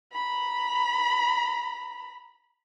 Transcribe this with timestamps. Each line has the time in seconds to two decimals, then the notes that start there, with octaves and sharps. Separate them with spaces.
0.12 A#5 B5